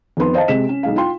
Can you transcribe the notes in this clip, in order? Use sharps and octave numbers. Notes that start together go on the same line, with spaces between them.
F2 D#3 B3 C6
C5 D#5 F5 A5
C3 G#3 B6 E7
C#4
B1 G#3 F5
F4 G5 C6